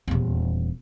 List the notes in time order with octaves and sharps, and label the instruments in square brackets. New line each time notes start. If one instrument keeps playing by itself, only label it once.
[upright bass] D#1 E2